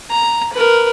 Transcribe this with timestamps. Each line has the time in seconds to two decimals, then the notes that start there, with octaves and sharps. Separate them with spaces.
0.11 A#5
0.53 A#4 B4